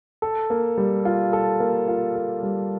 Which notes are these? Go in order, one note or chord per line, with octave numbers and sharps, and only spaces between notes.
A4
A#3
G3
F4
A4
A#3
F4
A4
G3